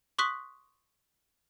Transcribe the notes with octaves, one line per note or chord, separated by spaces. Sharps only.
C6 C#6 D#6 F#6 B6